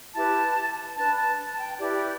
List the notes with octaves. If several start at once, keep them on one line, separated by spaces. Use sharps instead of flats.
E4 G4 B4 A5
D4 B4 A5
A5
A5
G5
E4 G4 B4 D5